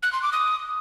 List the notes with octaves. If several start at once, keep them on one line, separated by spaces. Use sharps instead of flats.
F#6
C6
D6
D#6